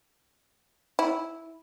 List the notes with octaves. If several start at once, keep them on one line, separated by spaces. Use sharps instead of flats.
E4